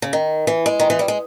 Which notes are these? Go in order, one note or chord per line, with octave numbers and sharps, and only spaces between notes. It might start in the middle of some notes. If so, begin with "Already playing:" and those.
C#3
D#3
E3
G#3
D#3
E3
G3
G#3